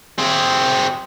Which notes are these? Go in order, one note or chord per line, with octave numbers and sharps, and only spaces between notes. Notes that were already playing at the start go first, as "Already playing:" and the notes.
C4 G#4